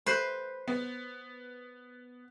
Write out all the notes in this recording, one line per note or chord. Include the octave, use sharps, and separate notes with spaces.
B4 C5
B3